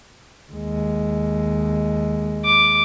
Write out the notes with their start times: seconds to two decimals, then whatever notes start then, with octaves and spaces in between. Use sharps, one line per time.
0.52 D#2 G#3
2.45 D6